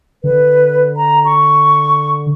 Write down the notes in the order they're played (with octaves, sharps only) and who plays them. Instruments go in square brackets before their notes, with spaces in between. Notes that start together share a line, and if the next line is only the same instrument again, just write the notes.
[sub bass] D3 [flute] B4
[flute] A#5
C#6